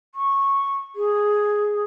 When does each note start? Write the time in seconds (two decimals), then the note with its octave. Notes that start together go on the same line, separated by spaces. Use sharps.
0.15 C#6
0.96 G#4